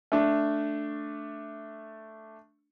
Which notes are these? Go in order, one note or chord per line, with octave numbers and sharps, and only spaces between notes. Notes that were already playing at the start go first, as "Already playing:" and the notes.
A3 D4